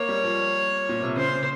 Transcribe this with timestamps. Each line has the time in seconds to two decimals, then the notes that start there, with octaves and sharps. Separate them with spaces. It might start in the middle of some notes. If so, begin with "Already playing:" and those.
Already playing: A#3 C#5
0.09 G3
0.24 F3
0.89 A#2
1.03 C3
1.16 C#3 C5